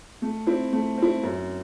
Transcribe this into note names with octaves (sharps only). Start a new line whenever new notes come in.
A3
C4 E4
A3
C4 E4
F#2